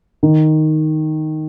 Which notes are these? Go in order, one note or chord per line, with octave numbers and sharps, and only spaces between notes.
D#3